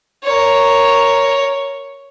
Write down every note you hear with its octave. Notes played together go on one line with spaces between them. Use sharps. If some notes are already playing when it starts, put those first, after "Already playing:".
A#4 C#5